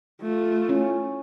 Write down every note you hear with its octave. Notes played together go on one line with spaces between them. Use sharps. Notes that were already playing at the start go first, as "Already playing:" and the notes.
A3 F4
C#4 E4